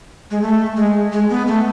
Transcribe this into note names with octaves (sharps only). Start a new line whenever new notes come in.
G#3
A3
G#3
G#3
B3
A3